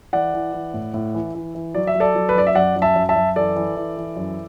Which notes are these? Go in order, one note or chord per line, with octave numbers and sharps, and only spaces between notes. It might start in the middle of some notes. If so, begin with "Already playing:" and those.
E3 D5 F#5
E3
E3
A2
A2
E3
E3
E3
F#3 D5
E5
F#3
A4 D5
F#3
B4
F#2 D5
E5
F#2 D5 F#5
F#2
E5 A5
F#2
E5 A5
F#2
E3 A4 D5
E3
E3
E3
F#2